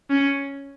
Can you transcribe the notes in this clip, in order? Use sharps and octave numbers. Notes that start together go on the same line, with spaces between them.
C#4